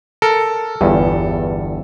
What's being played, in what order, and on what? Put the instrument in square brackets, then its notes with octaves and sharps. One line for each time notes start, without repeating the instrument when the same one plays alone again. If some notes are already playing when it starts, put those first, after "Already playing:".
[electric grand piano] A4 [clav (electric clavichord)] A#4
[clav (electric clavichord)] G1 E2 G2